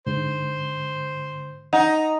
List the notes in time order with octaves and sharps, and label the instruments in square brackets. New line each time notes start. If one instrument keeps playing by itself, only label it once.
[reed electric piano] G#2 D3 [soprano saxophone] C5
[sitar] D#4 [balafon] F#5